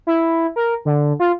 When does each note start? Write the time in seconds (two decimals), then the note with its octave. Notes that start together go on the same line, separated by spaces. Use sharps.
0.07 E4
0.56 A#4
0.85 D3
1.20 F4